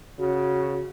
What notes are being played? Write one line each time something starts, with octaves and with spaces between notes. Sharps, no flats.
C#3 F#4